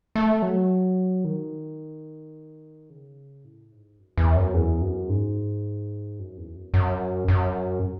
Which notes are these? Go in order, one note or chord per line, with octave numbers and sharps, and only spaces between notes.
A3
F#3
D#3
C#3
A2
G#2
F#2
E2
F#2
E2
F#2
G#2
F#2
E2
F#2
F#2
F#2